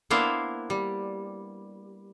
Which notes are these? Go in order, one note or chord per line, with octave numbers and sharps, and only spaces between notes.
A#3 B3 D4 E4 C5 F5
G3